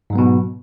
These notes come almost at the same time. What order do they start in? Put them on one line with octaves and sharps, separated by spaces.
G#2 F#3 B3 B2